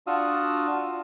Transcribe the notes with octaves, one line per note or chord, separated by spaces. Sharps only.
D4 F4 F#4 F5 D#6 E6